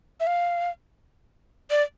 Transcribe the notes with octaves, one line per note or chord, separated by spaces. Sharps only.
E5
F5
D5